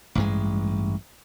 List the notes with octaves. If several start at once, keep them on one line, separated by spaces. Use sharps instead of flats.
A1 G2 G#3